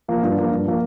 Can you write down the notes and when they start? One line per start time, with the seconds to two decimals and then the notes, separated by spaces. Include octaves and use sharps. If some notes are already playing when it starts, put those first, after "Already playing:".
0.08 F3 A#3
0.22 G2 F4
0.37 F3 A#3
0.51 G2
0.65 F3 A#3